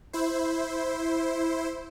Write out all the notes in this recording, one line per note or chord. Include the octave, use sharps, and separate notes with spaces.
E4 C5